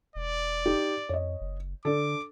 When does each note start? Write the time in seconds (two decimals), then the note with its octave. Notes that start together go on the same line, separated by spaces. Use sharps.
0.15 E1 D5
0.66 D#4 G4
1.09 F2 C#5 D#5
1.41 F#1
1.85 D3 D4 A4 D6